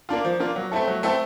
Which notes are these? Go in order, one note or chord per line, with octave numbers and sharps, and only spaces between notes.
A#3 D4 F4
F3
A#3 D4 F4
F#3
A3 C4 E4 A4
F#3
A3 C4 E4 A4